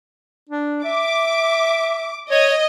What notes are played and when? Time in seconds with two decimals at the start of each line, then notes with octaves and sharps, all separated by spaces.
0.49 D4
0.84 E5 D6
2.31 C#5 D#5